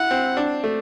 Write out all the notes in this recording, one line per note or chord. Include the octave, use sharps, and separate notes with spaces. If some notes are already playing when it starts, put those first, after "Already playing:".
Already playing: E4 F#5
C4
D4
A3